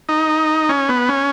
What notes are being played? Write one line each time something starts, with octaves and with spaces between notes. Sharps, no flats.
D#4
C#4
B3
C#4